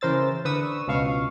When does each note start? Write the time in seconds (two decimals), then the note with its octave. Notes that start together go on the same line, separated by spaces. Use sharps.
0.01 C#3 E3 A#4 C5 E6 A6
0.45 D3 B4 C#6 D#6 E6
0.88 C#2 B2 F5 C#6